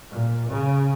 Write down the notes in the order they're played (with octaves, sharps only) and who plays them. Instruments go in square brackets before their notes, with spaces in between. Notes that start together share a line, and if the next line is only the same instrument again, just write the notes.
[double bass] A#2
C#3